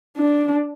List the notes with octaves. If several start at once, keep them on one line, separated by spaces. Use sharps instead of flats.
D4